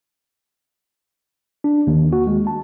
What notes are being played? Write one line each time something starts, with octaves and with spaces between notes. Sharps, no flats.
D4
D#2
F#4
G#3
A5